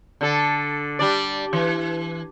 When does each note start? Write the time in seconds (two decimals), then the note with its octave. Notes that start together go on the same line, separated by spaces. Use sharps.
0.21 D3 A4
0.99 G3 D4 D5
1.53 E3